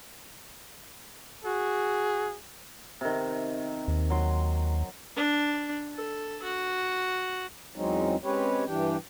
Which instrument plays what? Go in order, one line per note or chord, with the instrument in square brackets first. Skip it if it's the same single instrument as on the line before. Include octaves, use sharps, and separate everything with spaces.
[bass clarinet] F#4 [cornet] G#4
[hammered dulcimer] C3 D#3
[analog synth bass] D#2
[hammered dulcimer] F#3 C6
[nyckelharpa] D4
A4
F#4
[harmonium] E2 F#3 G#3 C4 C#4 D#4
G#3 C4 C#4 G4 B4 C#5
G2 E3 D4 G4 G5